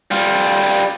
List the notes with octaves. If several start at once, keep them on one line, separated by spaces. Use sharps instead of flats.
G3 F4